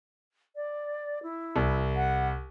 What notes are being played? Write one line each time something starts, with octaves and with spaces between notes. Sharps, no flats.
D5
E4
C2
F#5